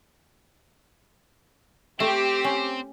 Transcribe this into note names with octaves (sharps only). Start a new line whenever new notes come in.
A3 C4 G4
C#4